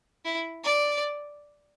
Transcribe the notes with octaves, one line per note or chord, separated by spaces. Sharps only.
E4
D5